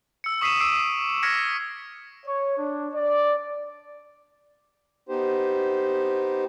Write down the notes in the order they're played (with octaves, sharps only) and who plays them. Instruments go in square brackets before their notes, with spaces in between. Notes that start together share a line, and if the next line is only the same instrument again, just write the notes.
[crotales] E6 C#7
C#6 D#6 B6 C7 D#7 E7
D6 E6 C7 D7 D#7
D6 F6 G#6 A#6 B6 C#7
[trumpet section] C#5
D4
D5
[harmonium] B3 D#4 G4 C5